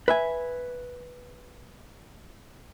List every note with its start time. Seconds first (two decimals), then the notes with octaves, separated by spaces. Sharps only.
0.08 B4 E5 G#5